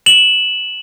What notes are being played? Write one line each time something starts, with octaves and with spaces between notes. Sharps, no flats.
E7 F#7